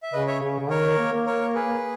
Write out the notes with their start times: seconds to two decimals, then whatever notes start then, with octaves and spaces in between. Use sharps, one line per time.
0.03 E5
0.13 C#3 B4 D#5
0.28 C#5 E5
0.42 C#3
0.59 C#3
0.70 D#3 A#4 C#5
0.98 A#3
1.12 A#3
1.26 A#4 C#5
1.54 G#4 B4